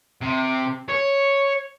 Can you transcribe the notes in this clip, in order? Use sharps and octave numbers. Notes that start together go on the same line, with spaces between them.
C3
C#5